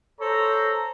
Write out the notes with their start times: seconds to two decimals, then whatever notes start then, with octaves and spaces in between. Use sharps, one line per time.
0.20 A4 C5 C#5 A#5